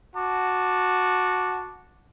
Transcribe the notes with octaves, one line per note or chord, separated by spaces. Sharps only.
F#4 A5 D6